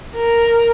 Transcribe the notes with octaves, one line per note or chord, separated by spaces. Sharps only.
A#4